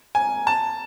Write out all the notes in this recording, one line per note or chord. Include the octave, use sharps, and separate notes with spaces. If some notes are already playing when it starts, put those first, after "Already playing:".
G#5
A5